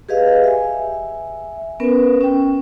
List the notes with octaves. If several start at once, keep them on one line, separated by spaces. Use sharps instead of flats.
G4 G#4 B4 D#5 F5
E5 G#5
B3 C#4 A#4 B4
C#4 G5